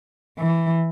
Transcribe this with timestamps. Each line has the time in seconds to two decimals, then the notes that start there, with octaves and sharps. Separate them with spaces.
0.37 E3